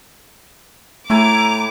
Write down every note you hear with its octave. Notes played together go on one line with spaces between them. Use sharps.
A2 A3 E4 G#5 A#5 D6